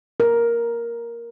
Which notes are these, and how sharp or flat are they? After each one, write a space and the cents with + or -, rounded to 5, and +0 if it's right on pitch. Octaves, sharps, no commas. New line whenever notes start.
A#4 +5